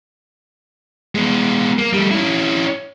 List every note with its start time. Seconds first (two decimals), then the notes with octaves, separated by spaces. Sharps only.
1.15 G#3 B3
1.78 A#3
1.93 G3 A3
2.11 C#4 E4